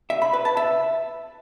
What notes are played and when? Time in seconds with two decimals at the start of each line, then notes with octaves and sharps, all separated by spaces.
0.10 E5
0.22 B5
0.33 B4
0.45 A5
0.57 E5